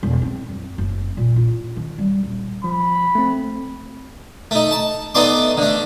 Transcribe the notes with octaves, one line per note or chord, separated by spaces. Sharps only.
E1
C4
F#2
F#1
A#2
F4
D#3
G3
D#1
F3 B5
A3 C4
A3 D#4
A5
A3 B3 D#4 D5 C6 D6
D3 A3